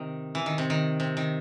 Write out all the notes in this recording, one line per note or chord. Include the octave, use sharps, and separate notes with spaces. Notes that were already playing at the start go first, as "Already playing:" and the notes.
Already playing: C3 D#3
E3
D#3
C3
D#3
C3
D#3